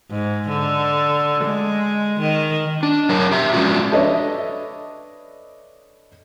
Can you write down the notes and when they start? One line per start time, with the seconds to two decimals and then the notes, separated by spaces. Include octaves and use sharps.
0.11 G#2
0.49 D3
1.45 G#3
2.20 D#3
2.83 D4
3.09 F#3 A#4 C#5 A5
3.31 G4 E5
3.53 F3 G#3 C#4 D4 F4 F#4
3.92 D4 A4 B4 C#5 D#5 E5